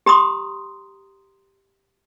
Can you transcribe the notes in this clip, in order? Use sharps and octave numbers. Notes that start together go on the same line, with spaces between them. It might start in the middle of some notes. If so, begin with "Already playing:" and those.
G4 A#5 C6 D#6